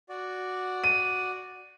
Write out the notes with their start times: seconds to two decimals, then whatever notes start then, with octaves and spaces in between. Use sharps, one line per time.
0.09 F#4 D5
0.84 D#7